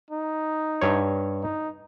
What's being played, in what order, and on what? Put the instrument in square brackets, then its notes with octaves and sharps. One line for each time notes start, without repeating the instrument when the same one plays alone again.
[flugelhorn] D#4
[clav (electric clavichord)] G2 C#5
[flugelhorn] D#4